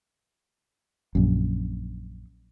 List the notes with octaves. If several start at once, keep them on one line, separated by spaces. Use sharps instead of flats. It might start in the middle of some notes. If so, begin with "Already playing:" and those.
A#1 F#2